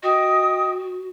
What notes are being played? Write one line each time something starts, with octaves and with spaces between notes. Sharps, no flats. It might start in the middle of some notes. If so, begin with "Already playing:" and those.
F#4 D#5 G5 D#6